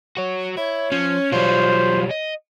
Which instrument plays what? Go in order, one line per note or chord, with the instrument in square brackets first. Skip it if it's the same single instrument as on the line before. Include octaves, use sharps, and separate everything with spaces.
[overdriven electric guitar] F#4 C#5
[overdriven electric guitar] E4 [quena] C#5
[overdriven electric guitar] F3 [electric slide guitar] C#4
[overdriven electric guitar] B2 G3 [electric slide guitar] F#3 F4 [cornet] C5
[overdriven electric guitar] D#5